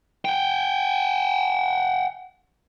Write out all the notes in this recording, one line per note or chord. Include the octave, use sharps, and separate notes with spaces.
F#5 G5